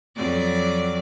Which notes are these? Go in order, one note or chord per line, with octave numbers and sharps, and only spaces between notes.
F2 F#3 D5